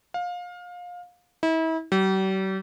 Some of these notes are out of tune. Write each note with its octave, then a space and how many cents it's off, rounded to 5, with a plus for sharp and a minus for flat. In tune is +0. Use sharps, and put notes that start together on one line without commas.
F5 +25
E4 -35
G3 -45